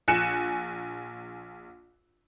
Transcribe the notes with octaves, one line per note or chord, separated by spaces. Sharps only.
A#1 G#5 F#6 C#7 E7